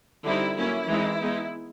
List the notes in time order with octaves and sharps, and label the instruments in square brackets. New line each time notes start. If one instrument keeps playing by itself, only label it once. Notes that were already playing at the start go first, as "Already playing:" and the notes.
[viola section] D3 G3 C4 D#4 E4
F#3 A#3 C#4 E4
E3 G#3 C4 D#4
G#3 B3 D#4